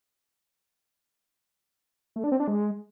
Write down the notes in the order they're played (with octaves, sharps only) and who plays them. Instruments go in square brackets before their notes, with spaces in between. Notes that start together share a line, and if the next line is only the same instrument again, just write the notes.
[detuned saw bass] A3
D4
C4
D4
G#3